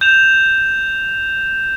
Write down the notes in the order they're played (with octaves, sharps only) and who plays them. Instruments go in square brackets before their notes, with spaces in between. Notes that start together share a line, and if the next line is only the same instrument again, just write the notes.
[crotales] G6 E7 F7